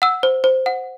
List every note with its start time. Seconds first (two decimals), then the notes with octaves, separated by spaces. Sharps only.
0.02 F#5 E6
0.23 C5
0.44 C5
0.66 F#5